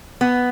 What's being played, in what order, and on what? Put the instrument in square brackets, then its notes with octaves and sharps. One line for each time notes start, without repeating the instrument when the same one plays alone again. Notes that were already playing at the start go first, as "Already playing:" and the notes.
[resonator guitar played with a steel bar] B3